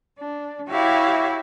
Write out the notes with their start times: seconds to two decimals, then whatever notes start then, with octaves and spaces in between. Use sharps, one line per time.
0.19 D4
0.69 E4 F#4 G4 C#5 E5 F5